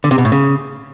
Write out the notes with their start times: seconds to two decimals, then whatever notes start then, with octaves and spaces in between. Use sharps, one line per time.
0.04 D3
0.11 C3
0.18 B2
0.25 A2
0.32 C#3